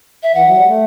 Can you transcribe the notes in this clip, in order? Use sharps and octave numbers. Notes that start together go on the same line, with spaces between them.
E5
E3 F#5
F#3
G3
A3